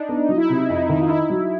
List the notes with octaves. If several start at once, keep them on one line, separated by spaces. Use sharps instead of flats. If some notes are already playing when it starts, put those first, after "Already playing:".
Already playing: D4 D#4
B3
F#3 D#4
E4
D#4
C3
F2 D#4
D#3
F4
D#4 E4
F#3